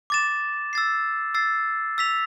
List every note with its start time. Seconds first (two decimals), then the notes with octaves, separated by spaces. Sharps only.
0.10 D6 A6 E7
0.73 E6 A6 C7
1.35 E6 A6 C7
1.98 E6 B6 F7